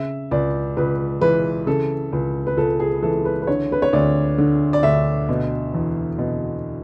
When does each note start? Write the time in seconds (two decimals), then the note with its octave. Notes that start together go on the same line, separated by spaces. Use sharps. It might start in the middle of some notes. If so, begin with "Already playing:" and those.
Already playing: C#3 E5
0.31 C#2 D5
0.77 C#2 B4
1.21 E3 B4
1.67 C#3 A4
2.12 C#2
2.47 B4
2.57 C#2 A4
2.80 G#4
3.03 E3 A4
3.25 B4
3.42 B4
3.47 D3 C#5
3.72 B4
3.82 C#5
3.93 D2 D5
4.38 D3
4.73 D5
4.83 D2 E5
5.29 B2
5.74 E2
6.18 B2